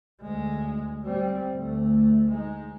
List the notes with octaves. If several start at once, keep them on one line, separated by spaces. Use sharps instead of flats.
D2 G#3
G3 C4
D2 A3
G#3 D#4